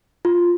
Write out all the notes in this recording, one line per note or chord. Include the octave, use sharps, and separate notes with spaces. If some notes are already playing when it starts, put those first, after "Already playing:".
F4